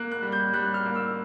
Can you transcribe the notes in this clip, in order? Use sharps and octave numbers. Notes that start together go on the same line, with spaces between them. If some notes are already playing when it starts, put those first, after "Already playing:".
Already playing: A#3 F#6
F#6
G3
G6
G3 F#6
F6
A#3
E6